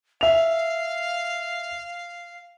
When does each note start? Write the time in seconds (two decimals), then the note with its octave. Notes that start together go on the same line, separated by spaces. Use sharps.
0.21 E5 F5 F7